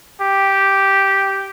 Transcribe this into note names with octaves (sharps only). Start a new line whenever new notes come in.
G4